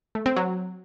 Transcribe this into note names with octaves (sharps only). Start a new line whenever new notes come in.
A3
C4
F#3